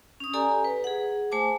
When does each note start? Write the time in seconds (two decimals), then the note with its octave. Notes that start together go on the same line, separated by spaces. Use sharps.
0.20 C#4 D#6
0.33 G4 A4 D5 G#5 A#5
0.64 B4
0.84 G#4 F#5
1.31 A3 C5 G#5 A5 D6